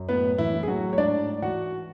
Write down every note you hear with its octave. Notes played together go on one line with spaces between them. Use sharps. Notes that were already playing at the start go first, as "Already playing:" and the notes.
Already playing: F#2
A2 B3 B4
E3 E4
A2
G#4
F#3 F#4
C#5
G#2 D4 D5
E3 F#4 F#5